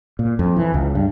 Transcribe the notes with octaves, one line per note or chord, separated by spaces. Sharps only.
A#2
F2
E3
C#2
G2